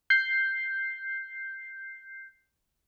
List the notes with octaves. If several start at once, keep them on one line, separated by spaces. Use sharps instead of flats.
G6 C7